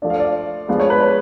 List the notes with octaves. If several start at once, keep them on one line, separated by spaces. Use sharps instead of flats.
F3 A3 D4 D5
F5
D5
F3 G#3 B3 D4 F5
C#5
B4
C#5